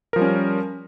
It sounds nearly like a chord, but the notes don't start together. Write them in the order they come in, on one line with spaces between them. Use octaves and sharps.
A#4 F3 G3 C#4